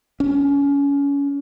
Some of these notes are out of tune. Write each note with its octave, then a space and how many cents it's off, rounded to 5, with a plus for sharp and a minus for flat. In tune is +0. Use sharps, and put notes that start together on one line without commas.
C#4 +25